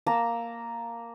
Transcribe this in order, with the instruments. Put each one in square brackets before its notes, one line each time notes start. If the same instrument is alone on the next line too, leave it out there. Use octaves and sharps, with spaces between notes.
[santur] A#3 A5 A#5 E6